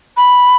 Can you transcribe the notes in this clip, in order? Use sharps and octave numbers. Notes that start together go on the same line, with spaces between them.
B5